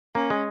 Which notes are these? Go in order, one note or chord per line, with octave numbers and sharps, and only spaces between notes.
A#3 C#4
G#3